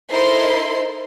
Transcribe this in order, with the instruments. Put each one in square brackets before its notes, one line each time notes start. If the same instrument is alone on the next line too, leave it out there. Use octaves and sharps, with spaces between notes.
[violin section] D#4 E4 A4 A#4 C5 C6